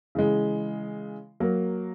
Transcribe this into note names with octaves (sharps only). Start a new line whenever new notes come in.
C#3 E3 G#3
F#3 A#3